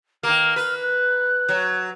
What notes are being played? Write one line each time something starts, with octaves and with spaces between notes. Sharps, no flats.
D#3 A#3 F6
B4
F#6
F#3